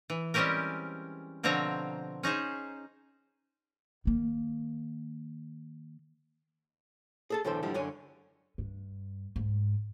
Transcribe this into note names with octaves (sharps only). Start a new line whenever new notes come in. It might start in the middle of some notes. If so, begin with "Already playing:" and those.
E3
G3 G#3 C4 C#4 G4 A#4
B2 D3 F3 C4 C#5 A#5
C#4 D#4 G#4 C5
D#3 A#3
G#4 A4 A5
B1 A2 D3 E3 A4 C5
G#2 D3 F3 G3 E4
F#2 D3 C#5 G#5
G2
G#2